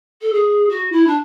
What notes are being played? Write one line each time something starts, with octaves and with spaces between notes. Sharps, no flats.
A4
G#4
F#4
E4
D4